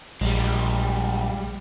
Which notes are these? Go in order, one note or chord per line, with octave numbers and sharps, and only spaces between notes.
A#1 G3 G#3